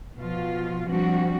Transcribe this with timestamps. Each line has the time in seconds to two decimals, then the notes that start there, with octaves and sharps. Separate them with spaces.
0.17 B2 F3 F4
0.87 F3 G3 C4 D4 F#4